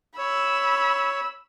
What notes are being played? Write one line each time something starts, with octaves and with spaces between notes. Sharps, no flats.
C#5 B5 E6